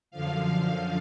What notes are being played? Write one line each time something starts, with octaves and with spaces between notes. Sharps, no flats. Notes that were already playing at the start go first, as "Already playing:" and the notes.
F#2 D3 F3 F5